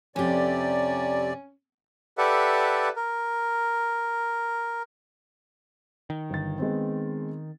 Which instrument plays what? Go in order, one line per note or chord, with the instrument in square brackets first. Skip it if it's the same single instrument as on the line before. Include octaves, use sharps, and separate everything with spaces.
[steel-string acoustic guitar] F2 G4 [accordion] C3 D5 [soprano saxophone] C#4
[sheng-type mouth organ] G4 A4 B4 D5 E5 F#5
A#4
[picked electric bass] D#3
[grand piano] G1 A6
G#3 B3 C4